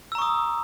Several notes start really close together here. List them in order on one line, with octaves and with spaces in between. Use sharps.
E6 A#5 C#6 D#6